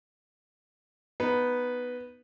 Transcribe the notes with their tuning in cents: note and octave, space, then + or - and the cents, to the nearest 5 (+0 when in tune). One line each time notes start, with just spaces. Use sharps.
B3 +0 D#4 +0